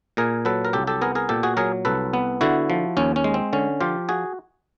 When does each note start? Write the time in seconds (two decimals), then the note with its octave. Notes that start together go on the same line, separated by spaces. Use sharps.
0.17 A#2 G#4 A#4
0.45 F#3 A4 B4
0.65 A#4
0.73 C2 G4 A4
0.87 G4 A4
1.01 B3 G#4 A#4
1.15 G#4 A#4
1.29 A#2 G4 A4
1.43 F#4 G#4
1.57 F#3 G#4 A#4
1.85 C2 A4 B4
2.13 B3
2.41 D3 E4 F#4
2.70 F3
2.97 D#2 C#4
3.16 C#4
3.24 G#3
3.34 C4
3.53 D3 C#4
3.81 F3 F4 G4
4.09 F#4 G#4